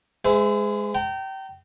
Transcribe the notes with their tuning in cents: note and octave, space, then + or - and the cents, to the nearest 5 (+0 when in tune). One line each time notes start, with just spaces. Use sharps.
G#3 +0 C5 -45 E5 +0
G5 -25 A#5 -35